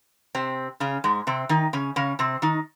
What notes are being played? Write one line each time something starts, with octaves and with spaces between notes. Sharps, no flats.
C3 C4
C#3 C#4
G#2 G#3
C3 C4
D#3 D#4
C#3 C#4
C#3 C#4
C3 C4
D#3 D#4